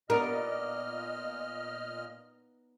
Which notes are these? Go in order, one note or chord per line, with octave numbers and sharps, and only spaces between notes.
A#2 B3 D#4 A#4 D5 D#5 F6